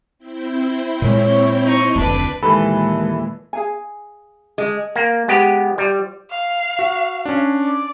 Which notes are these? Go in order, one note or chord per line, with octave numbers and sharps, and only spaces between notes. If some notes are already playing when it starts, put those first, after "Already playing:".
C4 E4 G6
A#2 G#3 C#5
D#4 C#6
F1 D2 D4 B4
D#2 A#2 E3 G#3 A4 B4 B5
G#4 F5 G#5
G#3
A#3
G#3 B3 G4
G3
F5
F#4
C#4 D4
D5